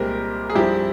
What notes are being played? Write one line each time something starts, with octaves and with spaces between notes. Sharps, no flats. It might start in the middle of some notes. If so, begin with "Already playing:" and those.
Already playing: C2 A#2 G#3 C4 G4 A#4
G#4
G2 F3 C4 E4 G4